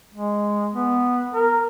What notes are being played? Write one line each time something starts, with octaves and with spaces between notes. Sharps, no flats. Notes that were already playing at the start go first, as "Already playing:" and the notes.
G#3
B3
A#4